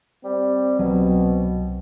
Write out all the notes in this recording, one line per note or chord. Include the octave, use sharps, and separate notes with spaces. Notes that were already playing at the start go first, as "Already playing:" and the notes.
G3 C4
C2 B2 F#3